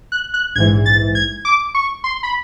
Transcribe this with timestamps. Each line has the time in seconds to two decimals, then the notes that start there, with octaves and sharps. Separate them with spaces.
0.12 F#6
0.34 F#6
0.55 A#1 G#2 E3 G#6
0.86 A6
1.15 G#6
1.45 D6
1.75 C#6
2.04 C6
2.23 B5